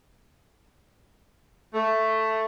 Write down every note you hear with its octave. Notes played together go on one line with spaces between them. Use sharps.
A3